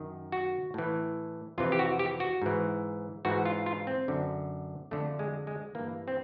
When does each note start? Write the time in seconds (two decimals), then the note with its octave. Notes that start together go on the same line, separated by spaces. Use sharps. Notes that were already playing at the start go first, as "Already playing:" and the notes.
Already playing: F#2 D#3
0.32 F#4
0.74 A2 E3
1.58 F2 C3 E3 F4
1.72 G4
1.79 F#4
1.99 G4
2.20 F#4
2.42 G#2 E3
3.25 G#2 E3 F#4
3.45 F4
3.66 F4
3.87 C4
4.08 F#2 D3
4.91 F2 D3 A3
5.19 G#3
5.47 G#3
5.75 G2 E3 A#3
6.08 C4